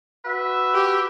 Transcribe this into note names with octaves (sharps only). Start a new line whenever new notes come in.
F#4 B4 E5
G4